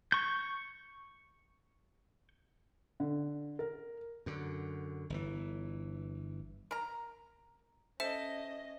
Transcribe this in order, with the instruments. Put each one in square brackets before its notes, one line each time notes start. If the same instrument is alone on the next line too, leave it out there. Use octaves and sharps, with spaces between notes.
[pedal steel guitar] C#6 G6
[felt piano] D3
A#4
[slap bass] F#2 D3
G1 E3
[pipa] A#4 A#5
[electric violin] C#4 D#5 [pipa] A4 [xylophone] C5 E5 E7